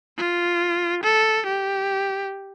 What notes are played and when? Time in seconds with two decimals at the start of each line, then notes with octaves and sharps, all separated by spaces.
0.17 F4
1.03 A4
1.46 G4